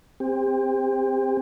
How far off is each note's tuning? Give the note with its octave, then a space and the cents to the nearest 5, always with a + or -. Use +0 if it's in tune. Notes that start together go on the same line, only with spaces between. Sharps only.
C4 +0 G4 +35